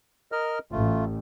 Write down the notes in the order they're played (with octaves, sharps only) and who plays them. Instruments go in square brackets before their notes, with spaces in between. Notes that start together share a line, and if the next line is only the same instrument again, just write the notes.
[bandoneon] A#4 D#5 F6
[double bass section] A1 [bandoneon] A3 F4